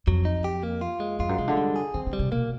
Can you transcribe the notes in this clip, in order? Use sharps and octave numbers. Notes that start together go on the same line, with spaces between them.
F2 F#3
D#4
G4
A#3
F4
G#3
F2 F4
F#2
C3 G#3
D3
G3
G#4
D#3 C4
D3
G3
C3
B2 A#3